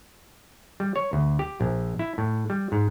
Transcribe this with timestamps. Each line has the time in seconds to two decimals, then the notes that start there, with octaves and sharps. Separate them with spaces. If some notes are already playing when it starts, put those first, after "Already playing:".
0.80 G3
0.96 C#5
1.13 D2
1.39 G4
1.61 A#1
1.99 E4
2.18 A2
2.50 G3
2.72 G#2